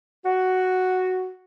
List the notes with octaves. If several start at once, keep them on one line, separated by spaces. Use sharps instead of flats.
F#4